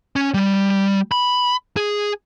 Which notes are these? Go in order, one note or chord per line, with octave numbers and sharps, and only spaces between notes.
C#4
G3
B5
G#4